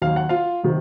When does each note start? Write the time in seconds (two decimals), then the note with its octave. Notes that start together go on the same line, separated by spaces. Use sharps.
0.02 D#2 D#3 F#3 F5
0.16 F#5
0.29 F4 F5
0.63 C3 D#3 F#3